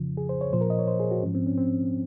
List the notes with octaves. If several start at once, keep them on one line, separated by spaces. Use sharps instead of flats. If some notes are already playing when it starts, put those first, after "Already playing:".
Already playing: F2 C#3 F3
G#4
C5
C#5
A#2 F3 C5
A#4
D#5
C#5
C5
G#4
F#4
G#2 F3 C#4
C4
C#4
C4